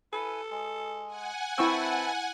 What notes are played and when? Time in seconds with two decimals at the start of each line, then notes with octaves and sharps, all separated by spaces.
0.13 E4 A4 B4 G#5
0.51 G#3
1.06 F#5 G#5
1.58 C4 E4 B4 E5 A5 C#6 E6